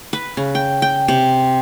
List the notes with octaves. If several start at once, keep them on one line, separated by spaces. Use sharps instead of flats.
B4
C#3
G5
G5
C3